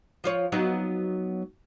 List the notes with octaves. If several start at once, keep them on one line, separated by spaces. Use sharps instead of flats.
F3 F4 C#5
F#3 B3 D#4